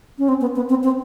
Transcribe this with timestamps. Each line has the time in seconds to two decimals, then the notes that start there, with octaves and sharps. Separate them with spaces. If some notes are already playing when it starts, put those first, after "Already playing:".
0.19 C#4
0.29 C4
0.41 B3
0.56 B3
0.70 C4
0.83 C4